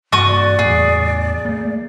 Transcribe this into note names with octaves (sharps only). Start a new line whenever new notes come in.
G2 E3 A#3 F#4 C#6 D#6
D5
E2 A2 G#4
A3 A#3